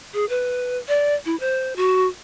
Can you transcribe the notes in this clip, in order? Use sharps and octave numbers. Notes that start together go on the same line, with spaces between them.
G#4
B4
D5
E4
C5
F#4